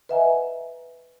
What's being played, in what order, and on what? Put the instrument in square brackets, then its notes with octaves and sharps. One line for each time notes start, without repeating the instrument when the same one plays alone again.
[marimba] B4 D#5 E5 F#5 G#5 A#5